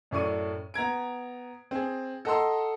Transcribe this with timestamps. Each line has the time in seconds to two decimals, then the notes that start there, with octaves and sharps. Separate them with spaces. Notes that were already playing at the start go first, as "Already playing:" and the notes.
0.11 F#2 A2 D5 C#6 D#7
0.74 B3 A#5 G#6 D7
1.71 C4 G#4
2.25 A4 D#5 F#5 A#5 C6 E6